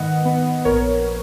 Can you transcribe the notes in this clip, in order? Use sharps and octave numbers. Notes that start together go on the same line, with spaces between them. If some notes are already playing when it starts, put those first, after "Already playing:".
Already playing: G#2 D#3 B3 D#5 F#5
B3
A#1 A#4 C#5